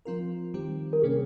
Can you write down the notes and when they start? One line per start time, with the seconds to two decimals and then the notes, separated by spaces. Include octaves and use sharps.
0.05 F3 C4 F4 A#4
0.54 D#3 G3 C4 G4
0.93 A#4
1.02 C3 G3 A#3 C#4 G#4